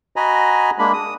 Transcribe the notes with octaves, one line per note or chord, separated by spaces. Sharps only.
F#4 D#5 G#5 A#5 B5
G#3 A#3 D4 B5
D#6